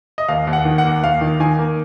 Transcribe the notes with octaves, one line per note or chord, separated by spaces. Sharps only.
D#5
D#2 F5
D#2
F#5
D#3
F#5
A#3
D#2 F5
D#3
D#3 G#5
A#3